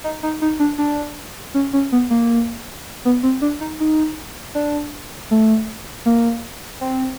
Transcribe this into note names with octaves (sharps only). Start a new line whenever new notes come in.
D#4
D#4
D#4
D4
D4
C#4
C#4
B3
A#3
B3
C4
D4
D#4
D#4
D4
A3
A#3
C4